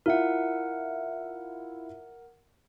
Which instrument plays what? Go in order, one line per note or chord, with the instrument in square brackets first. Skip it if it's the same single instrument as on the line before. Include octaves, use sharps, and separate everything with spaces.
[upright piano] E4 F4 E5 [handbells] A#4 F#5